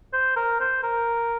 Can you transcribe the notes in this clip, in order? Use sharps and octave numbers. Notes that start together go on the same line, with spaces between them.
C5
A#4
C5
A#4